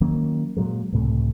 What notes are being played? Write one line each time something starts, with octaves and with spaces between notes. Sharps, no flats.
D#3 F#3 A#3 C#4
A#2 F#3 G#3
C#2 A2 C3 A3